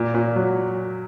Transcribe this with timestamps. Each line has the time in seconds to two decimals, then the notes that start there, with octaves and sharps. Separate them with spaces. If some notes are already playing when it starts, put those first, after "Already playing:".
Already playing: A#2
0.14 A#2
0.36 F#3